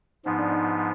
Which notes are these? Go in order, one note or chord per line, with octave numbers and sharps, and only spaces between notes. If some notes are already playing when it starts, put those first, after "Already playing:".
G#2 F3 B3 D#4
D4
D#4